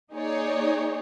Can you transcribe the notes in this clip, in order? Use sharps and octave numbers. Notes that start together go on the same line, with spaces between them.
A#3 D#4 G#4 C#5 D5